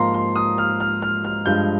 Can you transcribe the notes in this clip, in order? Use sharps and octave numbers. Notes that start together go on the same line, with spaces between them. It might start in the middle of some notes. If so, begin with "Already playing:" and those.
Already playing: G#2 F3 A#3 A#5 C6
C6
D#6
F6
F6
F6
F6
G2 F3 G#3 G6